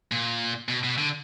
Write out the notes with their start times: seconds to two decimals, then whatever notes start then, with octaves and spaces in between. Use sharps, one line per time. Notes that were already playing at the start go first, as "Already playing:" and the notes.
0.12 A#2
0.69 B2
0.84 B2
0.98 D3